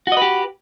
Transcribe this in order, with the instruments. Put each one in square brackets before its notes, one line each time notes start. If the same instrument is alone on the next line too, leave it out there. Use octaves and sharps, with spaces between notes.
[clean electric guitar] F#4
D#5
B4
G4